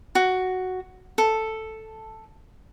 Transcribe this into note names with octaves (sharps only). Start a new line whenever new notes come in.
F#4
A4